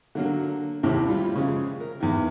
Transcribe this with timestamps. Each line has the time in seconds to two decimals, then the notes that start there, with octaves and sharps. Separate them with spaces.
0.15 D3 F#3 A#3
0.83 D#2 A2 C3 E3
1.08 G3 E4 F4
1.35 C#3 F3 G#3
1.80 A#4
2.00 E2 D#3